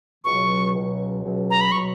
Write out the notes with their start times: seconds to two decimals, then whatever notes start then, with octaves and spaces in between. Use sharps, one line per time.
0.24 C#2 B2 F#3 C#6
0.73 C#2 B2 F#3
1.22 C#2 B2 F#3
1.50 A#5
1.61 B5
1.72 B2 F#3 C#6